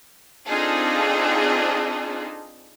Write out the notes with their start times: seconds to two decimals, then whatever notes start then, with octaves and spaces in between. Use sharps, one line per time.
0.48 C4 D4 D#4 F4 G#4 A4